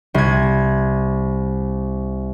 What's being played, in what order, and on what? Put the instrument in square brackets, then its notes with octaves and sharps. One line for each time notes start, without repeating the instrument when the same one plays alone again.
[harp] C2 G#6